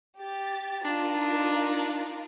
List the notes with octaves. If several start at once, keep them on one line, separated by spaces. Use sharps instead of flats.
G4 A6
D4 D#4 F4 A#4